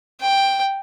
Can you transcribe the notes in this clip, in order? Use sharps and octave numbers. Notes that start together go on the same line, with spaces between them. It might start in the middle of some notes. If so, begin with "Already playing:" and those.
G5